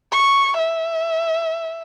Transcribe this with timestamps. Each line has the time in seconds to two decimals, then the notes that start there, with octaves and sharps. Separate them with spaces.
0.12 C#6
0.58 E5